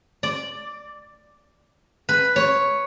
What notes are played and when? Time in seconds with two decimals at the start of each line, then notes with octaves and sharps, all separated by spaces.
0.23 D5
2.09 B4
2.36 C#5